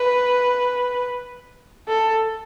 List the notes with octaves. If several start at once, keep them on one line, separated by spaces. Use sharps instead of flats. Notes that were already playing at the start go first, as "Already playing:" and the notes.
Already playing: B4
A4